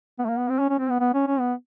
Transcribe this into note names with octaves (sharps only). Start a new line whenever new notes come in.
B3
A3
A#3
B3
C4
C#4
C#4
C4
B3
B3
C#4
C#4
B3